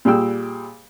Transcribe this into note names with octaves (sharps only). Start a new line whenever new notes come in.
A#2 G3 G#4 G5 E6